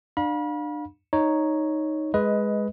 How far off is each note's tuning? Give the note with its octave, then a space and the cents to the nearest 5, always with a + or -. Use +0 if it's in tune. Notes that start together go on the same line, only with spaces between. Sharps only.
D4 +30 F5 +30 B5 -35
D#4 +0 C#5 +0 A#5 +0
G#3 +0 B4 +0 D#5 +15